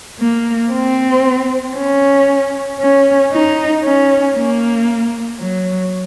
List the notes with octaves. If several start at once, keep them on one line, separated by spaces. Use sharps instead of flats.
A#3
C4
C#4
C#4
D#4
C#4
A#3
F#3